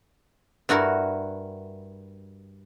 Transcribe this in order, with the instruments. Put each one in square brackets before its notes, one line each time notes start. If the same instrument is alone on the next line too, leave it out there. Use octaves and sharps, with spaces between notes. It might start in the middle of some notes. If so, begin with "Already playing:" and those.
[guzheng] G2 E4 F#4 A#4